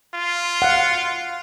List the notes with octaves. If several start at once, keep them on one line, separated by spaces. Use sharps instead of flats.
F4
F5 F#5